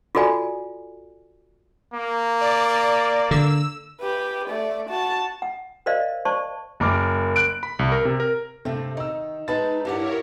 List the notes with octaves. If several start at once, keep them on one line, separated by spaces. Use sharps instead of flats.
F4 F#4 A4 D5 G#5
A#3
D5
D3 E6
G4 B4
A3 D5
F#4 A5
F#5
A#4 C5 D5 D#5 F5
C5 D5 A5 C#6
F#1 A#4 D6
F#6 D7
B5
C2
A#4
C3
A#4
G2 C3 A3 C4 A4
D#3 D#4 E6
G#3 D#4 B4 A5 B5 A6
G2 D4 E4 G4 A#4 C#5 F#5